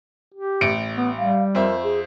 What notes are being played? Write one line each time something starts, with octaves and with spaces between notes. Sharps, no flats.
G4
A1 C#7 D7
B3
G3 F5
F2 A#4 C5 E5
G#4